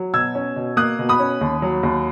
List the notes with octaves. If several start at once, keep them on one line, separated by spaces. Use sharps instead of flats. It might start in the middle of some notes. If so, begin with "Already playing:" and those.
Already playing: F#3
B2 E6 G#6
C#4
B2
A#3 D#6 F#6
B2
B5 D#6
C#4
D#2
F#3
D#2